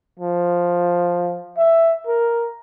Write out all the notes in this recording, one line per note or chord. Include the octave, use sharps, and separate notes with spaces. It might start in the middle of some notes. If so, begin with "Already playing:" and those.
F3
E5
A#4